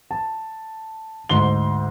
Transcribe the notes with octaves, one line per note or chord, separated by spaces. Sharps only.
A5
D2 G#2 C6 G7